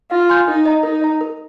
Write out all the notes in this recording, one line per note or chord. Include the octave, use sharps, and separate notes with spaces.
F4 F5
G#5 C6 G6
D#4 A#4
D#5 A#5
D#4 A#4
D#5 A#5
A#4